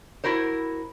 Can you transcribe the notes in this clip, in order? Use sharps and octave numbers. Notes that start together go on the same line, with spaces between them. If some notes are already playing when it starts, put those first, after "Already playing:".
E4 F#4 A#4 C5